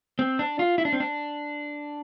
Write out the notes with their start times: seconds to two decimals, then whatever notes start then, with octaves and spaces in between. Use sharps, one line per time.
0.19 C4
0.39 D4
0.59 F4
0.78 E4
0.85 D4
0.93 C4
1.00 D4